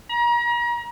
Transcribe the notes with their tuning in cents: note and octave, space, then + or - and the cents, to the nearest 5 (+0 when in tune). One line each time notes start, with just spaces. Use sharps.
A#5 +35